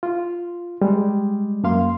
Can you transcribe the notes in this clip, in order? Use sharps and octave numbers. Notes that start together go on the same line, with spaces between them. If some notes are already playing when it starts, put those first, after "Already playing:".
F4
G3 G#3
F#2 A#3 F5 C6